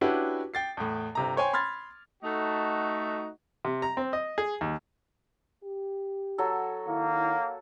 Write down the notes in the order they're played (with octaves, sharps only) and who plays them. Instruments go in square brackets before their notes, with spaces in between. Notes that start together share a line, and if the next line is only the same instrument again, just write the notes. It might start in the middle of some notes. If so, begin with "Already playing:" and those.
[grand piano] C#4 D4 E4 F#4 G4 B4
G5 A6 C7
E2 A2
G1 C3 A#5
C5 C#5 G5 G#5 C6
B5 C6 F6 G#6 A6
[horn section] A3 D#4 F#4
[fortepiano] C3
A#5
C4
D#5
G#4
D#2
[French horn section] G4
[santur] F#3 A4
[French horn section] D#3 E4 [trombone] A#3